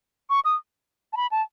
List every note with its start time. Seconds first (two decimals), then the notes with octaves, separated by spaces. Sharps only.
0.30 C#6
0.45 D#6
1.13 A5
1.17 B5
1.31 A5